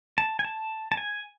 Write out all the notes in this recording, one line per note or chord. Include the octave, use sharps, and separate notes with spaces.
A5
G#5
A5
A5
G#5